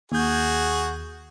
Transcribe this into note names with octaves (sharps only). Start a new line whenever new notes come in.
D#2 F#4 G#4 G6